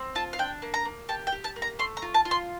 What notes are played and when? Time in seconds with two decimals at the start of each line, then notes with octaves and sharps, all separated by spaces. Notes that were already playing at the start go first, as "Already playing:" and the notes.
Already playing: C4
0.15 F4 A5
0.33 F5
0.39 D4 G5
0.62 A#3
0.74 A#5
0.85 A#3
1.09 G4 A5
1.27 G5
1.32 G4
1.44 A5
1.56 A#3
1.62 A#5
1.79 A3 C6
1.97 A#5
2.02 F4
2.14 A5
2.25 F4
2.31 C6